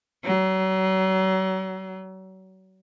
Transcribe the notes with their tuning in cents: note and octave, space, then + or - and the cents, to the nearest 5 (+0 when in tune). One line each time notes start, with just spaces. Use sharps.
F#3 +35